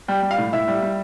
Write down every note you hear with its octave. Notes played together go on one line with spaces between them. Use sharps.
G3 G5
G3
F5
A2
A2 E5
G3
G3